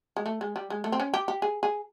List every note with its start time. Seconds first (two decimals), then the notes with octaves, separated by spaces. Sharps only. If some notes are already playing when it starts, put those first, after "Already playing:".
0.17 G#3
0.26 A3
0.41 G#3
0.56 G3
0.70 G#3
0.84 A3
0.92 C4
1.00 C#4
1.14 G4
1.28 G4
1.42 G#4
1.63 G#4